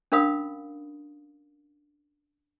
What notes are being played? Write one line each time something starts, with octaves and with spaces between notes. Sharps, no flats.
C#4 D4 A#4 F5 B5 D#6